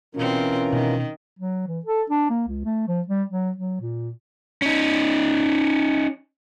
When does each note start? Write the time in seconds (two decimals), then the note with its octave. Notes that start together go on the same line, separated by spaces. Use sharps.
0.15 B2 E3 C4 C#4 F4 A#4
0.73 B2 D#3
1.39 F#3
1.68 E3
1.86 A4
2.10 D4
2.30 A#3
2.48 C#2
2.65 A3
2.88 F3
3.08 G3
3.29 F#3
3.56 F#3
3.81 A#2
4.62 C#4 D#4